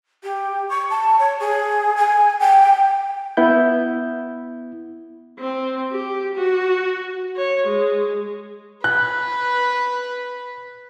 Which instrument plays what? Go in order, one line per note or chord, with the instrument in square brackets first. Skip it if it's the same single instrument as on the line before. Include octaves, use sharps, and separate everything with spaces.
[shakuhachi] G4
C#6
A5
C#5
G#4
G#5
G5
[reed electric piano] B3 E4 G6
[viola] C4
G4
F#4
C#5
G#3
[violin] B4 [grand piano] F#6